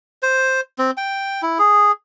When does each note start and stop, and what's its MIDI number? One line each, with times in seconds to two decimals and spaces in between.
0.23 0.61 72
0.79 0.91 60
0.97 1.42 79
1.43 1.58 64
1.59 1.92 68